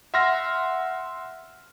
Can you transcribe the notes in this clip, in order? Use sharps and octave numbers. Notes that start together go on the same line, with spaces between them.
E5 F#5 C6 F6 A#6